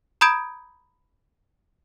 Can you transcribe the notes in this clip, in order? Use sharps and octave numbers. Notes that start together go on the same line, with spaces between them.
A#5 B5 D#6 G6 G#6 D7